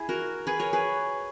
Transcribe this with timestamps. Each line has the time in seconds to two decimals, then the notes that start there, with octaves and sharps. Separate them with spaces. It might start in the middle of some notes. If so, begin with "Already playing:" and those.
Already playing: E4 G#4
0.09 F#4 A#4
0.47 G#4 B4
0.59 A#4 C#5
0.73 G#4 B4